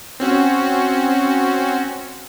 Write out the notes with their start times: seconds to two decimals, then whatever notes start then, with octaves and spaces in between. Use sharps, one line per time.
0.20 C4 C#4 F#4